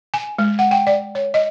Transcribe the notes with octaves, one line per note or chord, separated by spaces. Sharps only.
G#5
G#3
F#5
G5
D5
C#5
D#5